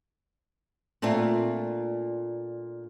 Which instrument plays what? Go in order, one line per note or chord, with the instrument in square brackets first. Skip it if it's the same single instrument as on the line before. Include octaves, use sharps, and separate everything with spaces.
[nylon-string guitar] A#2 A3 C4 D4 F4